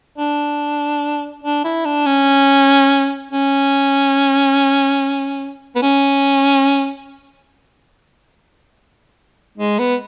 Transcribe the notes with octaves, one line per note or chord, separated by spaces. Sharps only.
D4
D4
E4
D4
C#4
C#4
B3
C#4
G#3
B3